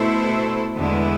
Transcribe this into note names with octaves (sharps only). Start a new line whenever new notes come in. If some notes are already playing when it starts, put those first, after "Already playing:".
Already playing: B2 A3 E4 A4 C5
E2 D3 G#3 B3 E4